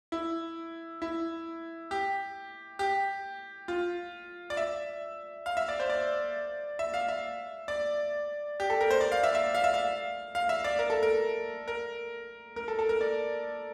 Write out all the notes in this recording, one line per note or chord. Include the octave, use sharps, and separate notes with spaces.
E4
E4
G4
G4
F4
D5
E5
F5
E5
D5
C5
D5
E5
F5
E5
D5
G4
A4
A#4
C5
D5
F5
E5
E5
F5
E5
F5
F5
E5
D5
A#4
A4
A#4
A#4
A#4
A4
A4
A#4
D5